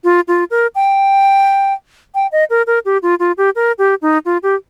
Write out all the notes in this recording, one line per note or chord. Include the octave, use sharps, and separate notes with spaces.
F4
F4
A#4
G5
G5
D#5
A#4
A#4
G4
F4
F4
G4
A#4
G4
D#4
F4
G4